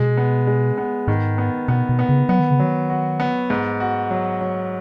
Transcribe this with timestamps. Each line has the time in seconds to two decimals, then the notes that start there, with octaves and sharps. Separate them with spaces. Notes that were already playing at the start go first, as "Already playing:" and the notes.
Already playing: B2 G#3
0.17 B3
0.47 G#3
0.78 B3
1.08 G#2 D#3
1.38 B3
1.68 B2 B3
1.89 B2
1.99 B3
2.09 C#3
2.29 F#3 B3
2.40 D#3
2.50 C#3
2.59 D#3 F#3
2.90 F#4
3.20 B3
3.50 G#2
3.80 F#4
4.11 F#3
4.41 F#3